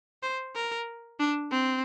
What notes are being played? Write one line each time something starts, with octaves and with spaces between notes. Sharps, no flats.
C5
A#4
D4
C4